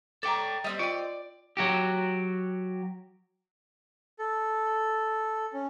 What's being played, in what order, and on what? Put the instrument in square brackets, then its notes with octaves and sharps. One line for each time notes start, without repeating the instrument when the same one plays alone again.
[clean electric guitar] A4 G5 [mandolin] D5 A#5
[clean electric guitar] G3 [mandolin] C4 C#4 D#5
[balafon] F4 G5 [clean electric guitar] D5
[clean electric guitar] F#3 F#4 G4
[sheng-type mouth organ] A4
C#4